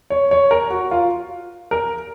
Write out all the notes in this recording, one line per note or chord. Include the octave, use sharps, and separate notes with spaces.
C#5
C#5
A#4
F#4
F4
A#4